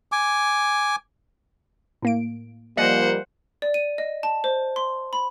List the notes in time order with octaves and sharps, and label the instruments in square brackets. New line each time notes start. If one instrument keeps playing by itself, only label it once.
[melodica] G#5 D6
[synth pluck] A2 A#3 D7
[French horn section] F3 G3 A#3 [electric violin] C5 F#5 [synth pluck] D5 D#5 G#5
[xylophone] D5
D#7
D#5
A5
C5
C6
B5